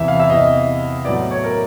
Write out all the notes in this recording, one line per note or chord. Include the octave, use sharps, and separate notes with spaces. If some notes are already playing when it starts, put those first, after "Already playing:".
Already playing: E2 C3 E3 E5
F5
E5
E2 C3 E3 D#5
A2 F#3 B3 D5
C#5
A#4